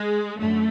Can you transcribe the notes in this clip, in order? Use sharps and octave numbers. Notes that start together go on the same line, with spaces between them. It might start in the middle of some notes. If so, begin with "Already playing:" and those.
Already playing: G#3
F#2 D3 A3